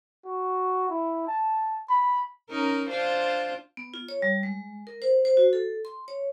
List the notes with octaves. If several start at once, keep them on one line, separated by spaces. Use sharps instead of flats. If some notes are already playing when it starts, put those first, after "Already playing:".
F#4
E4
A5
B5
C#4 D#4 A#4
D4 F4 C5
B3
F4
C#5
G3
G#3
A#4
C5
C5
F#4
A4
C6
C#5